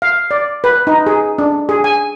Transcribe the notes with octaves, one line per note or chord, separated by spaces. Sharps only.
F5
D5
B4
D#4
G#4
D4
G#4
G#5